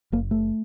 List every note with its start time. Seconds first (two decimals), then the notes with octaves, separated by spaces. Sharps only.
0.12 F#1 A#3
0.31 A3